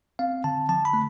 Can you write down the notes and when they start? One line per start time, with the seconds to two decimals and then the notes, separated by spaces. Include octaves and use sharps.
0.19 C4 F5
0.44 D3 A5
0.69 F3 A5
0.85 B5
0.94 A3